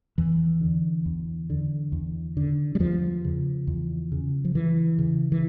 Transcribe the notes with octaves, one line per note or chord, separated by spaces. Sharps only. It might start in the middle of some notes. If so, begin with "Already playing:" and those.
E2 E3
D3
E2
D3
E2
D3
G3
E2 F3
C#3
E2
C#3
F3
E2 E3
C#3
E3